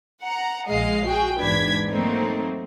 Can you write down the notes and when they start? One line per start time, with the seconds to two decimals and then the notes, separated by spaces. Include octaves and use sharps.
0.22 F#5 A#5
0.67 A#1 G#3 D#5 F5 C7
1.07 F#4 G#4 G5
1.40 E2 G#2 D4 B4 G#6 B6
1.89 F#3 A3 A#3 C4 D#4